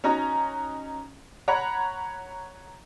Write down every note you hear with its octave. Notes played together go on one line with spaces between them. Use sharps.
C#4 D#4 F#4 A#5
C#5 F#5 A#5 B5